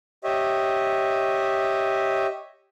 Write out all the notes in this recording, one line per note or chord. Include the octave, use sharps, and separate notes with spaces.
G4 C#5 D#5 E5